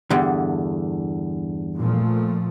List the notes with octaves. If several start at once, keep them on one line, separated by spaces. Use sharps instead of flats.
E2 G2 D3
A#2 F3 A3